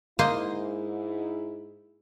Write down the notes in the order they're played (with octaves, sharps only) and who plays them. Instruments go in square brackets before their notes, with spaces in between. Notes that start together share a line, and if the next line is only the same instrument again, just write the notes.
[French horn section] G#2 E4 [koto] A#3 C5 D#5